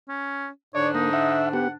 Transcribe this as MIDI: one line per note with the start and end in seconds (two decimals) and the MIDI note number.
0.08 0.48 61
0.75 1.77 44
0.75 1.77 50
0.75 1.77 62
0.75 0.88 73
0.75 0.91 74
0.95 1.10 58
0.95 1.38 63
1.13 1.49 76
1.13 1.49 78
1.53 1.68 59
1.53 1.68 67
1.53 1.70 78